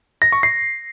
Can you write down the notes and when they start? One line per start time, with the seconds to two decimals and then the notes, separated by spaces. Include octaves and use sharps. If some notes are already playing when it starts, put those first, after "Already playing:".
0.22 A#6
0.32 C#6
0.43 C7